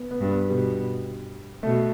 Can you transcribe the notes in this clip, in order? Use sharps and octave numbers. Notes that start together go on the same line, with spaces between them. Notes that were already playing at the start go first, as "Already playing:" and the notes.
Already playing: B3
B3
G2
B3
B2 G3
B2 A3